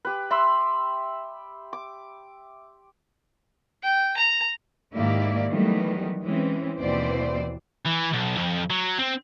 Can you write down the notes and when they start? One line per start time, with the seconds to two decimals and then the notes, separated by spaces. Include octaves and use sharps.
0.05 G4 B4
0.30 E5 B5 C6 E6
1.73 D6
3.83 G5
4.17 A#5
4.95 G#2 D#3 A#3 E4 G4 D5
5.49 D#3 E3 F#3 G3 A3 B3
6.22 E3 G#3 C4 C#4
6.78 D#2 B2 E3 C4 C5 D5
7.85 E3
8.13 B1
8.37 F2
8.70 F#3
8.99 C4